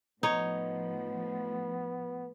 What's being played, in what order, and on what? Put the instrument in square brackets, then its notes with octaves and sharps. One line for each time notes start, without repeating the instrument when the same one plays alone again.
[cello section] A2 F3 [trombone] B3 [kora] D#4 C#5